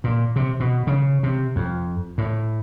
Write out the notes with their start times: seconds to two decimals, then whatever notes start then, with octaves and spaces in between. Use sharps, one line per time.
0.04 A#2
0.36 C3
0.60 B2
0.87 C#3
1.23 C3
1.56 F2
2.18 A2